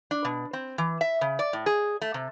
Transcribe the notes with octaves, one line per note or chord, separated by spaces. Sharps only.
D4
B2
C4
E3
E5
C#3
D5
A2
G#4
A3
C3